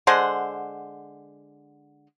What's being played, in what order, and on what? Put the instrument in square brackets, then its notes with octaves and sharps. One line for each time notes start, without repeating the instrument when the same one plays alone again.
[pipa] D3 G#3 C5 F#5